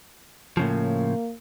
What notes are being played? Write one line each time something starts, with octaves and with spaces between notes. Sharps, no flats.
A2 C#3 F3 A#3